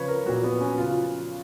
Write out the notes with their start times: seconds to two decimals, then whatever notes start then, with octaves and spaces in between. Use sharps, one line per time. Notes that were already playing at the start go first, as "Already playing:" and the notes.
Already playing: C#3 F3 B4 C#5
0.08 A#4
0.26 A#2 F#3 F#4
0.44 B3
0.61 C#4
0.78 C#3 F3 F4